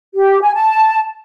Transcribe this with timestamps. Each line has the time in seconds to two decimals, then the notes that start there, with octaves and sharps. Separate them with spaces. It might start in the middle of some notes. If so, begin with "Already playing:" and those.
0.14 G4
0.42 G#5
0.55 A5